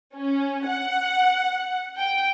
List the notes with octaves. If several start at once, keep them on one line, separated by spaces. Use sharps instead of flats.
C#4
F#5
G5